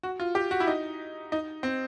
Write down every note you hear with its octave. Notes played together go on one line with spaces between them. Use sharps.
F#4
F4
G4
F#4
E4
D#4
D#4
C4